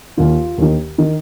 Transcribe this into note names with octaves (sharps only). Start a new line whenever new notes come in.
D#2 D#3 F4
D#2 D#3
D#3